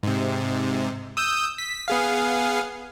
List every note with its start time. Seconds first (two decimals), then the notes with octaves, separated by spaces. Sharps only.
0.03 G#2 C3
1.17 D#6 E6 G6
1.58 B6
1.88 B3 G#4 F5